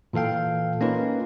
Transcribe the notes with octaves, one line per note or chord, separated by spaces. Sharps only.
A#2 E3 A4 F5 G5
A#3 C#4 D#4 F4 B4